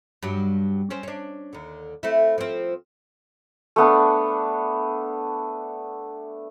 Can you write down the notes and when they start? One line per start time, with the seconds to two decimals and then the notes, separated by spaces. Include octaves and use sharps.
0.23 G2 F#3 G4
0.90 C4 C#4
1.03 C#4 D4
1.53 D#2 D3
2.03 A3 C4 E4
2.38 F3 C4
3.76 A3 B3 D4